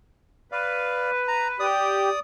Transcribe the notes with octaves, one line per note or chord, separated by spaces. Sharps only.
B4 D5 F5
A#5
G4 D5 D#6